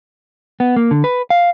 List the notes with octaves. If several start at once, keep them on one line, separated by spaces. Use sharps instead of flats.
B3
A#3
D3
B4
F5